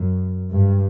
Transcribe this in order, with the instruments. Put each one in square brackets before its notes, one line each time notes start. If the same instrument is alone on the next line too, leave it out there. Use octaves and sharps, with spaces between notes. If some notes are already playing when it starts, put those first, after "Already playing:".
Already playing: [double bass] F#2
G2